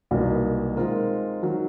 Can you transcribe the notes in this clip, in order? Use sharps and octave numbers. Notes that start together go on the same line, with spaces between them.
C2 B2 F#3 A#3 D#4
D#3 G#3 C4 F4 A#4
D#3 F#3